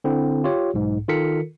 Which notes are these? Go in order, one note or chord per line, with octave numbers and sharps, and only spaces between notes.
D3 C4 E4
F4 G4 C#5
B1 G#2
D#3 F4 A4 A#4 B6 C#7